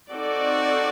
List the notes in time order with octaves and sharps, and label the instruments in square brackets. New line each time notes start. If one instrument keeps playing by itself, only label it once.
[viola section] C4 D#4 A4 D5 [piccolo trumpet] F#4